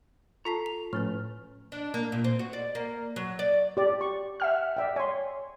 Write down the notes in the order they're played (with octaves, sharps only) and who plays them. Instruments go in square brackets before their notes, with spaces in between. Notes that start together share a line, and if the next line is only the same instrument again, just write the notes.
[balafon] F4 A5 [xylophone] A4 B6 C7 [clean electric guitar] A#5
[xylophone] F7
[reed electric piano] A2 [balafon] F3 C#4 B4 [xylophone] F6
[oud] D4
A#3
A#2
C4
F#4
D5
A#3
F#3
D5
[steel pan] G4 D5
C#6
[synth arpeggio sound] E5 F#5 F6
[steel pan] D5 E5 G5
[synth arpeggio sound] C#5 [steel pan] G#5 C6